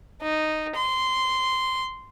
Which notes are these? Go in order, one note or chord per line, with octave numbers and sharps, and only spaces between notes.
D#4
C6